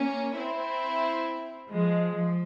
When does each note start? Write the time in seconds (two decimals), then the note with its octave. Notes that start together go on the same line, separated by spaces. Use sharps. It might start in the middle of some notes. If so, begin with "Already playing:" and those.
Already playing: A#3 C#4
0.37 C4 E4
1.70 F3 G#3
2.15 F3